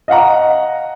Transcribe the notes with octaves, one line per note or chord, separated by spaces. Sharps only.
D#5 F5 F#5 A#5